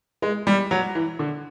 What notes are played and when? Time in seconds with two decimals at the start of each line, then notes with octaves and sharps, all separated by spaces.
0.22 G#3
0.47 G3
0.71 F#3
0.95 E3
1.19 D3